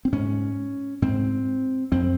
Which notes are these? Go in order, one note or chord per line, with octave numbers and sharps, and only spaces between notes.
C4
G#2 C#4
G#2 C4
F2 C4